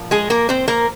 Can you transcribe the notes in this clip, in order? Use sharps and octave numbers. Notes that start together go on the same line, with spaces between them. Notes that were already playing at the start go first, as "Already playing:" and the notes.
Already playing: A#2 F3
G#3 G#4
A#3 A#4
C4 C5
A#3 A#4